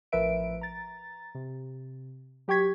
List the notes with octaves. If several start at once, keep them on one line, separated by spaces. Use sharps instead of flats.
A1 F3 A#4 B4 E5 D7
A#5 A6
C3
F#3 G4 G5 C#6 G#6 B6